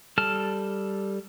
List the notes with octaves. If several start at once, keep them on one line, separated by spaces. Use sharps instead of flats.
G3 A4 A5 F6